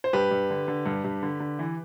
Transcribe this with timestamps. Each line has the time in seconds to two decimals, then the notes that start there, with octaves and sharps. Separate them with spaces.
0.04 C5
0.13 G2 G4 B4
0.31 G2
0.50 D3
0.68 D3
0.86 G2
1.04 G2
1.23 D3
1.40 D3
1.59 E3